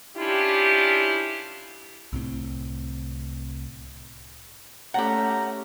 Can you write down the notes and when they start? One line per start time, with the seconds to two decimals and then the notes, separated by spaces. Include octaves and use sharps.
0.17 C#4 D4 E4 F4 G4
2.13 C2 A2 C4
4.94 A3 C#4 G4 F#5 A#5